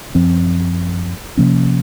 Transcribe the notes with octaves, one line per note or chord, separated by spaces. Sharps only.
F#2 F3 C4
C3 F3 A#3 C#4